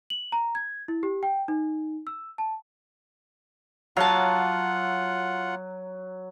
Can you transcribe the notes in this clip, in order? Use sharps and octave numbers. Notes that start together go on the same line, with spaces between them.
F#7
A#5
G#6
E4
G4
G5
D#4
E6
A5
F#3 F4 F5 F#5 A5